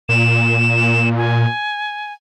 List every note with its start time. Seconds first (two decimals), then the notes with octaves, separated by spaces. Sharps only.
0.09 A#2 E7
1.17 G#5